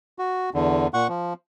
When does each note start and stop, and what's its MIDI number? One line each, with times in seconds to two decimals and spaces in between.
0.19 0.50 66
0.54 0.87 40
0.54 0.87 50
0.94 1.07 46
0.94 1.07 78
0.94 1.07 85
1.09 1.33 53